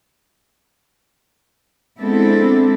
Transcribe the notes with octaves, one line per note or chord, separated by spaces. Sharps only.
G#3 B3 C4 D4 E4 A4